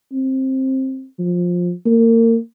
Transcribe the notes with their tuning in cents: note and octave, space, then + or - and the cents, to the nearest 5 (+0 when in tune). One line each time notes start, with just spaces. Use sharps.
C4 +15
F3 +15
A#3 -30